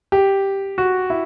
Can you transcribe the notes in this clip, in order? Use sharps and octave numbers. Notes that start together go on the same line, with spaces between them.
G4
F#4
E4